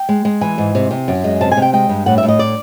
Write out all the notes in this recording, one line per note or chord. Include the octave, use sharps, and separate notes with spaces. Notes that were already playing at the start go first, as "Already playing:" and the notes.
Already playing: G5
G#3
G#3
E3 G#5
G#2
C3
C3
F#2
G#3
C3 A5
G#5
C3
G5
G#3 G5
G2
A2 F#5
E5
A2
D#5
D5